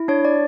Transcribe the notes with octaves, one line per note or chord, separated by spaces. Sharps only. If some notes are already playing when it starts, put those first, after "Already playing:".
Already playing: E4
D4 C#5
D5